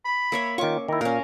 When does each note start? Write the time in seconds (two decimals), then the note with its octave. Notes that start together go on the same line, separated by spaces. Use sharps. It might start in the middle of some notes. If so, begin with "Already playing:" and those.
0.05 B5
0.32 A#3 C#5 E5
0.58 D#3 C#4 F4 C#6 D6
0.88 D#3 E4 A#4
1.01 A#2 C#4 A#4 F5